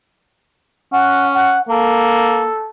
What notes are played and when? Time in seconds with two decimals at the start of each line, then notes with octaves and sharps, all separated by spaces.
0.93 C#4 F#5
1.34 F#5
1.69 A#3 A4